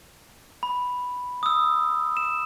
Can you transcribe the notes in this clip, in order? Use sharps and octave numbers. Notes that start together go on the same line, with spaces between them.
B5
D#6 E6
E7